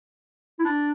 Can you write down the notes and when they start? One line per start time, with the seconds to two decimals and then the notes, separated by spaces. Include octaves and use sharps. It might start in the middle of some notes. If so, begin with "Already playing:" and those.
0.59 E4
0.65 D4